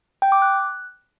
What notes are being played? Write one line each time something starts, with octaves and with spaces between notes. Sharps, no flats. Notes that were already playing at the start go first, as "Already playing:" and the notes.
G5
D6
F#6